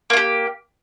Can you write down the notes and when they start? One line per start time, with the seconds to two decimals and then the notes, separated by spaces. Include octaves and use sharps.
0.10 A#3
0.13 F4
0.17 G4